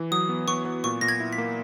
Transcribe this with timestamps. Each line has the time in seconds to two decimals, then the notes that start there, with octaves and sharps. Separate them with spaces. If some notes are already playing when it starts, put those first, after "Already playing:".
Already playing: E3
0.11 F#3 D#6
0.29 B3
0.47 B3 C#6
0.65 B3
0.84 A#2 C#6
1.01 A#2 A#6
1.08 G#6
1.20 E4
1.33 B6
1.38 A#3